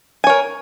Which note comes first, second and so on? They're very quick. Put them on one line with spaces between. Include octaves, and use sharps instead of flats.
G#5 C#5 A#4